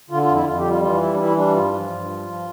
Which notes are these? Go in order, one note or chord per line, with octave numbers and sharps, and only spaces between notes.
D3 F4
F4
F2
E4
F2 F4
G4
G3
F4
E3 F4
G3 E4
D4
E3 E4
G3 D4
G2 F4
F3
G2
F3
F3